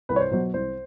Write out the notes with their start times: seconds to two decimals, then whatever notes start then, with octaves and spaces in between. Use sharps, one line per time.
0.09 C2 B4
0.16 C#5
0.20 C5
0.31 B2 F#3 C5
0.54 C2 C5